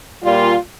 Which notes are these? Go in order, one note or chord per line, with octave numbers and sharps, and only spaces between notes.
A#2 G3 F4